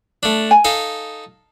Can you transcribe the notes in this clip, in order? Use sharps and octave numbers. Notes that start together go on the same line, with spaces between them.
A3 D4
G#5
D#4 A4 F5